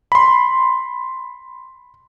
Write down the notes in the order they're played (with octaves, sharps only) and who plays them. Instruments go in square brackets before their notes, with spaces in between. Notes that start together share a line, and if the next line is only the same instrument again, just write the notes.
[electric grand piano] B5 C6